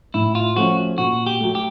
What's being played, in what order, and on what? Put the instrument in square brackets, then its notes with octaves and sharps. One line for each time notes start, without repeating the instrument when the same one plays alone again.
[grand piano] A2 [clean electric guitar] E4
[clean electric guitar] F4
[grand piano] F3 A3 C#4 [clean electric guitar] F#4
[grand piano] A#2 [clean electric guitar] F#4
[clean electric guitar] G4
[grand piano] F#3 A3
[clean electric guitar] G4